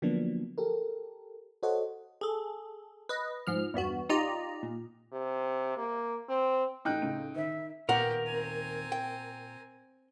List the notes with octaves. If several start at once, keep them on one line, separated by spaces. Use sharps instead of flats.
D3 F3 F#3 A#3 B3 D4
G4 A4 A#4
F#4 A4 C5 C#5 D#5 F#5
G#4 A4
B4 D#5
G#2 F3 F6
E2 G2 B3 F#4
D#4 F4 G4 D5 D#5 A#5
A#2
C3
A#3
C4
A1 A3 D#4 G5 E6 F#6
C#2 A2 D7
D#3 E5
D#2 A#2 B3 G4 A#4 F#5
C4 G#5
G5